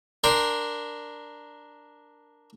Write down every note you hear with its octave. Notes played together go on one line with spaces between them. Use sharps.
D4 A#4 G5 C6